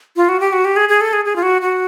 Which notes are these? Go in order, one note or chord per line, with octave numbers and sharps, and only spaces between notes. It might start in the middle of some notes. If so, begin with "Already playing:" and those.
F4
F#4
G4
F#4
G4
G#4
G#4
A4
G#4
G#4
F4
F#4
F#4